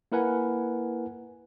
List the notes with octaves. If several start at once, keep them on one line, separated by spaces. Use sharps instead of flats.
A#3 E4 A#4 B4 F#5 G#5